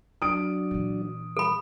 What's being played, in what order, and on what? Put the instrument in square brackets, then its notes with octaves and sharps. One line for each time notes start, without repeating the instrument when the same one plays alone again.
[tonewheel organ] F#3 D4 [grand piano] D#6 D7
[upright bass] A#2 E3
[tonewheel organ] G3 [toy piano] A4 B5